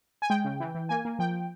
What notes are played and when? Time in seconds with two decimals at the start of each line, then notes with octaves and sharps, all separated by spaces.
0.22 G#5
0.30 G#3 G5
0.44 C#3
0.60 E3
0.75 E3
0.89 A#3 G#5
1.05 A#3
1.19 F3 G5